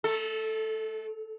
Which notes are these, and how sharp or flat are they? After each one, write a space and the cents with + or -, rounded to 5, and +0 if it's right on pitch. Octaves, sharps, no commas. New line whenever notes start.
A3 -35 A4 +0